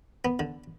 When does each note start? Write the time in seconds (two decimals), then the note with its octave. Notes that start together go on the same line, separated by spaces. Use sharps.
0.25 B3
0.39 D3